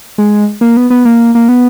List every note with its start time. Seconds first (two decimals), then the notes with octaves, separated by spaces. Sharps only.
0.18 G#3
0.61 A#3
0.77 B3
0.90 B3
1.05 A#3
1.35 A#3
1.48 B3